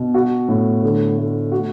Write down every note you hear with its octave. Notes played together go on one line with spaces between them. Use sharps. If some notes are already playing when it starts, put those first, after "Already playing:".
Already playing: B2
F#4
A2
D3
A3
F#4